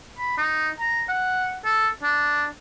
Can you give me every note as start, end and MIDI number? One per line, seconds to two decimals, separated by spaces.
0.19 0.34 83
0.37 0.69 63
0.79 1.03 82
1.09 1.56 78
1.65 1.88 69
2.03 2.46 62